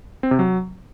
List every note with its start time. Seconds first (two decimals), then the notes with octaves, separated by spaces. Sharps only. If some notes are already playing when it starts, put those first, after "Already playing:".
0.23 C4
0.31 C3
0.39 F#3